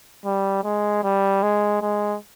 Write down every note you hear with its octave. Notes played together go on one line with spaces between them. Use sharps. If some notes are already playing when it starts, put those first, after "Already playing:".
G3
G#3
G3
G#3
G#3